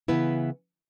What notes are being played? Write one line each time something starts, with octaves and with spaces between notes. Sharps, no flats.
C#3 E3 B3 E4 B4